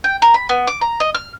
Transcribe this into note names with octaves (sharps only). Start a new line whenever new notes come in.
G5
A#4
B5
B3
D6
A#5
D#5
F6